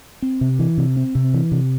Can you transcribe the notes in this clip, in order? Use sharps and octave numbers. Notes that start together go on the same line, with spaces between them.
C4
C3
E3
C3
C4
C3
E3
C3